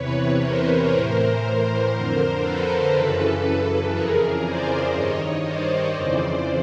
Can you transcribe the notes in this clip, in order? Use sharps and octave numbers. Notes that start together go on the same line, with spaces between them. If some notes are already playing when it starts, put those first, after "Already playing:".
Already playing: E2 C3 E3 B4 C#5
A#4 C5
A2 E3 A#4 C5
F2 D3
A4 B4
F#2 C#3 E3
F2 C#3 E3 G#4 A#4
C5 D5
G2 D#3 C#5 D#5
C5 D5
F2 C#3 E3 C5 D5